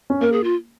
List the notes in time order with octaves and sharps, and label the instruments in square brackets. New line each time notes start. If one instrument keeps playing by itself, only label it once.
[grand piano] C#4
[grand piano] A#3 [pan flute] A#4
[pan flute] G#4
F4